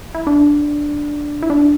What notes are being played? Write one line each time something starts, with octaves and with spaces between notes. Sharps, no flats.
E4
D4
E4
D4